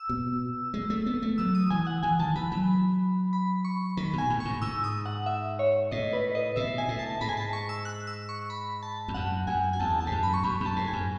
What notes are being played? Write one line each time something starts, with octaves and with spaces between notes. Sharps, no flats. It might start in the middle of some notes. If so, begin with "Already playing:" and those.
Already playing: E6
B2
G#3
A3
B3
A3
F#3 E6
D#6
E3 G#5
F#5
E3 G#5
D#3 A5
E3 B5
F#3 B5
B5
C#6
D#3 B5
B2
G#5
A2
G#2 C#6
G#2 E6
D#6
F#5
E5
C#5
A2 D#5
B4
D#5
B2 E5
G#5
A2
A5
G#2 B5
G#5
A5
C#6
E6
F#6
E6
C#6
B5
A5
E2
F#2 F#5
F#2 G#5
G#5
E2 A5
A5
G#2
F#2
B5
C#6
F#2 B5
F#2
A5
G#2
G#5
F#2